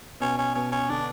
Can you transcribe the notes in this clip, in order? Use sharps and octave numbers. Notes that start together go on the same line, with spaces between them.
B2 C#4
C#4
B2 C#4
C#4
D3 D4